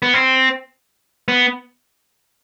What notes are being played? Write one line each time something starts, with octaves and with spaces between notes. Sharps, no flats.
B3
C4
B3